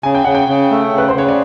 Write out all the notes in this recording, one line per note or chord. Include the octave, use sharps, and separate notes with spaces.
C#3 G#5
G5
C#3 F#5
G5
C#3
A3
C#3 B4
C5
C#3 C#5
D5